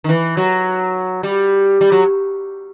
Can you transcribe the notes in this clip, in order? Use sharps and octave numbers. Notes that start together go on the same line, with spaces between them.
D#3
E3
F#3
G3
G3
F#3